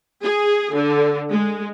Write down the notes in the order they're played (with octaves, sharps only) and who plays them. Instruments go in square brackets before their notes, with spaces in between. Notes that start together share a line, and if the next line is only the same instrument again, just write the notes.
[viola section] G#4
D3
G#3